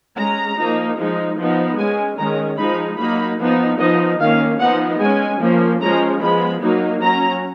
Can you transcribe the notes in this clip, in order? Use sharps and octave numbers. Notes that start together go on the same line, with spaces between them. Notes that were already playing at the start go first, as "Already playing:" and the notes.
G#3 C#4 A#5
F3 A#3 D#4
F3 G#3 D#4
F3 B3 D#4
G#3 C#4 G#5
D#3 G#3 C#4 A#5
F3 G#3 D#4 B5
F#3 A#3 D#4 B5
F3 B3 D#4
F3 B3 D#4 D#5
D#3 A#3 C#4 F5
F3 B3 D#4 F#5
G#3 C#4 G#5
F3 A#3 C#4
F3 G#3 C#4 A#5
F3 G#3 B3 B5
F#3 A#3 D#4
F#3 C#4 A#5